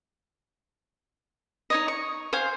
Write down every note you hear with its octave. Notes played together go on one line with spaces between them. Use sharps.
D#4 C#5 D#5
C#6
C5 F5 G#5 C6